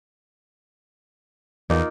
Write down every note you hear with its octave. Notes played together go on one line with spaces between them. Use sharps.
E2 A#3 D#4 F4